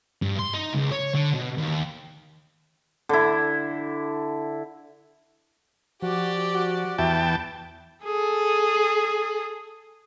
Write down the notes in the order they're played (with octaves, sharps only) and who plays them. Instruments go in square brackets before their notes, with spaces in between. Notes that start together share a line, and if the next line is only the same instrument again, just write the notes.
[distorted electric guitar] G2
C6
D#4
C#2
C#5
D3
B2
D#2
[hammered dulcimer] D3 E4
[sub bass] F3 [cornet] F#4 [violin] G4 D5
[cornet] F#4
[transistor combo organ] E2 G5 A5 [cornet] E5
[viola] G#4 A4